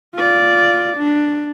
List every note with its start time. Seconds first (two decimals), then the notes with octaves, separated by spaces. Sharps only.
0.15 F4 D5
0.97 D4